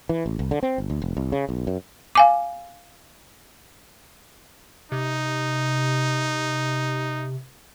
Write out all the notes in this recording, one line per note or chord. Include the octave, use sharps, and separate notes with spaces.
E3
A1
C2
D3
C4
G1
D2
F1
C2
C#3
B1
F#2
F5 G#5 D6
C3 D#4